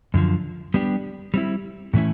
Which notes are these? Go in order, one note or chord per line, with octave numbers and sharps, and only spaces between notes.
F#2 D3 F3
G3 B3 D4 G4
G3 C4 E4
A2 E3 A3 C#4 E4